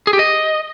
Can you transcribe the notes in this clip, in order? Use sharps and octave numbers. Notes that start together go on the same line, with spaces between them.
G#4
G4
D#5